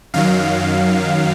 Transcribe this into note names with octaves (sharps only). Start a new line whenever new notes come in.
F#2 D#3 F#3 F5